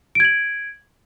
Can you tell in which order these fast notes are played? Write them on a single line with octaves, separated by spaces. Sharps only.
D7 G#6 F#7